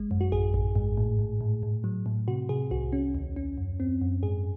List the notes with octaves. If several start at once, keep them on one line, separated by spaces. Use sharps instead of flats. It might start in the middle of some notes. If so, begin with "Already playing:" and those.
Already playing: G#1 G#3
F#2
F#4
A1 G#4
A1
G#2
A2
A2
A2
A2
F#3
A2
C3 F#4
C3 G#4
C2 F#4
C#4
D#2
C#4
F#2
C4
F#2
G#2 G#4